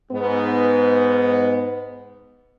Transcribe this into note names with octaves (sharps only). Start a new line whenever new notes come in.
G#2 B3